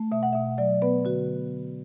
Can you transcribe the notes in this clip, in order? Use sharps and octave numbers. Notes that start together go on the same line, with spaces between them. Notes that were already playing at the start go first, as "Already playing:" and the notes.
Already playing: A3
B2 E5
F#5
B2 E5
F#3 D5
B3 B4
D3 F#4